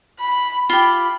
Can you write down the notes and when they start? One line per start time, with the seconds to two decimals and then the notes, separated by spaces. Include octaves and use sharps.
0.20 B5
0.70 F4 G4 B5